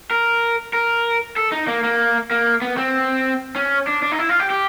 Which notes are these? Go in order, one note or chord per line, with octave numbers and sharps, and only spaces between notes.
A#4
A#4
A4
D#4
A#3
A#3
A#3
B3
C4
C#4
D4
D4
D#4
E4
F4
G4
G4